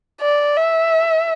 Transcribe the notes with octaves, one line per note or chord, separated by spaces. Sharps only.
D5
E5